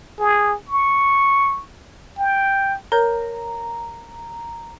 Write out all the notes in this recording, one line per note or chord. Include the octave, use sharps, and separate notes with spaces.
G#4
C#6
G5
A#4 C#5 A#5 G6